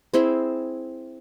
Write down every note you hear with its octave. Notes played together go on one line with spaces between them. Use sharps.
C4 E4 G#4 E5